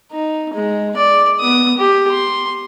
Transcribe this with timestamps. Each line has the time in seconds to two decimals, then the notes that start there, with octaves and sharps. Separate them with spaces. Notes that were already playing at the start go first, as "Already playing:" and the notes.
0.12 D#4
0.54 G#3
0.97 D5
1.40 B3 D#6
1.78 G4
2.10 C6